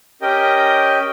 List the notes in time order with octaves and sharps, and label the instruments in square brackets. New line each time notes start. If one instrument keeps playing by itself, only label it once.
[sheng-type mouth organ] C#4 G4 A#4 D#5 G5